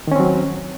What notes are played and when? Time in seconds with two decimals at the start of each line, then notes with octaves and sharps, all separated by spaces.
0.07 D#3
0.12 C#4
0.16 C4
0.20 F#3